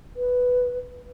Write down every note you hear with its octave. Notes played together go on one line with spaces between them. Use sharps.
B4